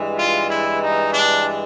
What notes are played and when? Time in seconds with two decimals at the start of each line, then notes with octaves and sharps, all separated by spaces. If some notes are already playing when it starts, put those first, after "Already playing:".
Already playing: G2 E3 G#3
0.18 F4
0.50 E4
0.81 D#4
1.12 D4